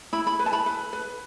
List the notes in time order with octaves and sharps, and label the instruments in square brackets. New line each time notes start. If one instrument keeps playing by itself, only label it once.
[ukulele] E4 B5
B5
B4
A5
B5
B4
B4